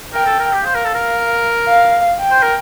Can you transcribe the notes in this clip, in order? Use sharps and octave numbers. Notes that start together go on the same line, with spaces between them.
A#4 G5
A4
A#4
G4
C5 F5
A#4
A4
A#4
F5
G5
C5
A#4